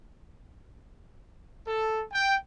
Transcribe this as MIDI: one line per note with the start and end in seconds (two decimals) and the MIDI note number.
1.67 2.03 69
2.12 2.37 79